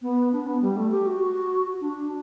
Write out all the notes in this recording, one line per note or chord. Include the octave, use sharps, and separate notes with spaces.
B3
D4
B3
G3
A3
G4
F#4
D4